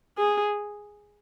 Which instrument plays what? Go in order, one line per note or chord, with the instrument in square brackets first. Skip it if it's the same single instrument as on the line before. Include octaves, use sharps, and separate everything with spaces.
[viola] G#4